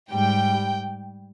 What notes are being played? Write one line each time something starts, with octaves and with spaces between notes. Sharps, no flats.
G#2 G3 G5